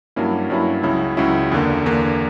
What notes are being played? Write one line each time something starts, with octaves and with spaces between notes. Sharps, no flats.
G2 F#3 A#3 C#4 E4
G2 F#3 A#3 C#4 E4
C#2 C#3 F#3 C#4 E4
C#2 C#3 F#3 C#4 E4
E2 D3 A#3
E2 D3 A#3